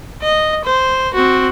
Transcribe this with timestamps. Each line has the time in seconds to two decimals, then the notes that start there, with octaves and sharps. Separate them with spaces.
0.22 D#5
0.65 C5
1.14 C4 F#4